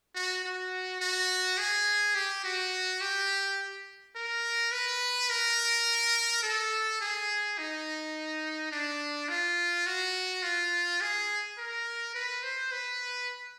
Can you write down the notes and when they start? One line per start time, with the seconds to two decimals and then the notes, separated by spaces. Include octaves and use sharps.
0.15 F#4
0.44 F#4
1.01 F#4
1.58 G#4
2.15 G4
2.44 F#4
3.01 G4
4.16 A#4
4.72 B4
5.30 A#4
6.43 A4
7.01 G#4
7.58 D#4
8.72 D4
9.29 F4
9.86 F#4
10.43 F4
11.01 G#4
11.58 A#4
12.15 B4
12.43 C5
12.72 B4